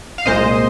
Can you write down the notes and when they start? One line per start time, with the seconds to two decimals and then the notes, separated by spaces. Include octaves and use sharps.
0.18 F5
0.25 C2 A#2 G#3 C5 D#5